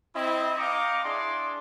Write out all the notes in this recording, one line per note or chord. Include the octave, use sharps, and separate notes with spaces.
C4 E4 D#5
D#5 F5 G5 A#5 C#6 D6
D4 E4 G#4 D5 C6